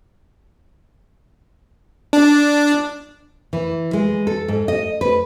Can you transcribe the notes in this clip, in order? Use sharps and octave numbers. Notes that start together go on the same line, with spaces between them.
D4
E3
G#3
A4
G#2
D#5
B4